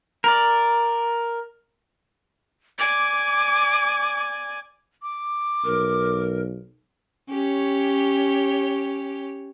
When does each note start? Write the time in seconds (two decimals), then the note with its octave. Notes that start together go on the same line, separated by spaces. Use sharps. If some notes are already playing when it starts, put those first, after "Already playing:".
0.24 A#4 D5
2.79 D5 G#5 D6
5.02 D6
5.64 B1 A#4
7.29 C#4 G4 C#5